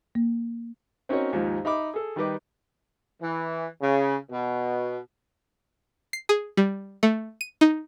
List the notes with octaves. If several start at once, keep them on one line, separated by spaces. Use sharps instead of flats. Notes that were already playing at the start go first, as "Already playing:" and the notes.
A#3
C4 C#4 D#4 F#4 A#4 C#5
D#2 G#2 F3
D#4 E5 B5 D6
G#4 A4
D#3 G3 D#4 B4 D#5 D6
E3
C#3
B2
C7
G#4
G3
A3
D#7
D#4